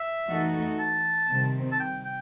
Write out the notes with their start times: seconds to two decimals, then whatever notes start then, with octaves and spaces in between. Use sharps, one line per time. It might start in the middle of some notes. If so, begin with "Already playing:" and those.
Already playing: E5
0.28 E3 A3 D#4 F#4 A4
0.79 A5
1.30 C3 D#3 G3 C4
1.72 A5
1.80 G5
2.05 G5